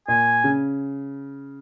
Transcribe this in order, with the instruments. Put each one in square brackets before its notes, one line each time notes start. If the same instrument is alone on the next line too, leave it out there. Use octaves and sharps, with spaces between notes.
[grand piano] A#2 [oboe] G#5
[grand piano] C#3